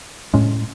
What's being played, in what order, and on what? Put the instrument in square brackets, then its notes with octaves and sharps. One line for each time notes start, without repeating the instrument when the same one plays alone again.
[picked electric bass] A2 G#3 C#4